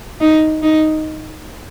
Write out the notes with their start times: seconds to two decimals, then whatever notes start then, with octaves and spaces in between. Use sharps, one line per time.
0.21 D#4
0.63 D#4